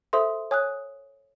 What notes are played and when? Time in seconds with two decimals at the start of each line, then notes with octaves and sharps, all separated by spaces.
0.13 A4 C5 E5 C6 D#6
0.51 C#5 G#5 D#6 F#6